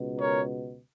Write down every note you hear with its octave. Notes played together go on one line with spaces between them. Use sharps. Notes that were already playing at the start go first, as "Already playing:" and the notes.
Already playing: C#2 B2
A#4 C#5